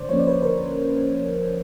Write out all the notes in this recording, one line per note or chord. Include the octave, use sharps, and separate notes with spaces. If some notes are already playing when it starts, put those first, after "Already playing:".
Already playing: D3 C5 D5
F3 A#3 C#4 C#5
D5
B4 C#5
D3 A#4 C5